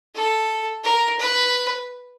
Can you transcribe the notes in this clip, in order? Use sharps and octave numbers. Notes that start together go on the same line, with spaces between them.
A4
A#4
B4